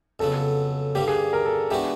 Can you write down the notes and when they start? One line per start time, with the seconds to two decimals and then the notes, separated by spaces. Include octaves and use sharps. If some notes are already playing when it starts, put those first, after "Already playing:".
0.19 F2 C#3 F#3 B3 A4
0.95 G2 D3 G3 A#3 G4
1.08 G#4
1.33 A#4
1.46 A4
1.71 E3 G#3 B3 D4 F#4 G4